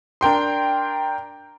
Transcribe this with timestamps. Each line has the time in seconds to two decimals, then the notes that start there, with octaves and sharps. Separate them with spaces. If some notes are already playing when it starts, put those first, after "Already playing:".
0.21 D4 A#4 G5 C6